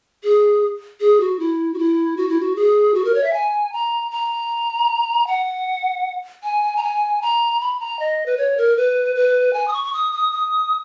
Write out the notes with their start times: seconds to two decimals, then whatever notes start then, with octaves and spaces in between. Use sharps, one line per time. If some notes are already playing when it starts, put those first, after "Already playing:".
0.24 G#4
1.00 G#4
1.20 F#4
1.39 E4
1.74 F#4
1.79 E4
2.17 F#4
2.29 E4
2.40 F#4
2.56 G#4
2.94 F#4
3.05 A#4
3.14 C#5
3.24 E5
3.33 G#5
3.73 A#5
4.11 A#5
5.27 F#5
6.43 G#5
6.77 A#5
6.83 G#5
7.22 A#5
7.61 B5
7.80 A#5
7.99 D#5
8.26 B4
8.38 C#5
8.58 A#4
8.77 B4
9.16 B4
9.53 G#5
9.68 D#6
9.73 C#6
9.84 C#6
9.93 D#6
10.12 D#6
10.32 D#6